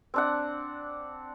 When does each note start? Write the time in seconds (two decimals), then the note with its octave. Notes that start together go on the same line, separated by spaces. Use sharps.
0.14 C4 D4 F#5